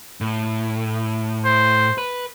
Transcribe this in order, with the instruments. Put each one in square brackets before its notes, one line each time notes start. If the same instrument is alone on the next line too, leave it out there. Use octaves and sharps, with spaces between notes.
[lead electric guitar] A2
[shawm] C5
[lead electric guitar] B4